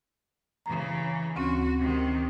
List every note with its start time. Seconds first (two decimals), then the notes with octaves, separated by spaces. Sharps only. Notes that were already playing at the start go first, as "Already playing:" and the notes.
0.66 C#3 E3 A#5
1.36 D2 C4 C#4 F#4
1.78 C3 D#3